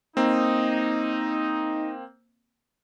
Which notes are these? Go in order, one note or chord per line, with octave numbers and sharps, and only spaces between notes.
A#3 C4 D#4